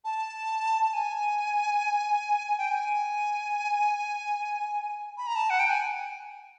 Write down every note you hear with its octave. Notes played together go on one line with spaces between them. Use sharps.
A5
A5
G#5
G5
G#5
B5
A#5
A5
F#5
G5
G#5